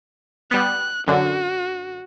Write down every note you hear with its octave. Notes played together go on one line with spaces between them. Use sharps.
G3 B3 F#6
F#2 D3 F#4